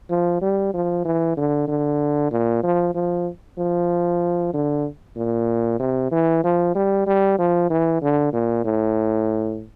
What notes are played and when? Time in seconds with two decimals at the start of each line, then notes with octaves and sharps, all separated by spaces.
0.10 F3
0.42 G3
0.74 F3
1.05 E3
1.37 D3
1.68 D3
2.32 A#2
2.64 F3
2.95 F3
3.58 F3
4.54 D3
5.17 A#2
5.80 C3
6.12 E3
6.44 F3
6.75 G3
7.07 G3
7.39 F3
7.70 E3
8.02 D3
8.33 A#2
8.65 A2